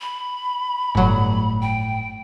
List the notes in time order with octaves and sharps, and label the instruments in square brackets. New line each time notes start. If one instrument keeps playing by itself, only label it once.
[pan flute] B5
[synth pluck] G1 F#3 [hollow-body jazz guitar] A2
[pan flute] G5